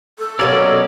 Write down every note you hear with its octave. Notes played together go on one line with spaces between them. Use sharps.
A4
B2 F#3 A#3 C#4 D5